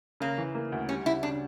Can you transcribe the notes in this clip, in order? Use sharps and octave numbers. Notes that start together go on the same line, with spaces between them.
C#3 A#3
E3
A#3
D2
G3 C#4
C#3 E4
C#3 D4